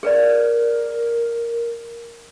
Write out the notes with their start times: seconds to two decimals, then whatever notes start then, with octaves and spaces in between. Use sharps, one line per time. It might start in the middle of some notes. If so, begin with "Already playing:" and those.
0.03 G#4 A#4 B4 D5